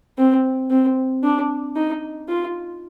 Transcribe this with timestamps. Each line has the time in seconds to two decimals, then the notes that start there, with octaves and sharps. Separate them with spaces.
0.18 C4
0.70 C4
1.24 D4
1.76 D#4
2.29 F4